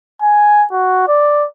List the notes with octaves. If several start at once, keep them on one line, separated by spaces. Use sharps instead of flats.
G#5
F#4
D5